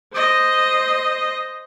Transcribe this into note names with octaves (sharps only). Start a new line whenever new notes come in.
C5 D#5